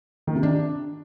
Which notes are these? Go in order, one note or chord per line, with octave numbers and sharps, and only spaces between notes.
D#3
C3
D4